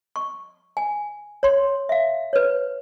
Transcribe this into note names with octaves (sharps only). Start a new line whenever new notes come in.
C#6
G#5
C#5 C6
E5 F5
B4 C#5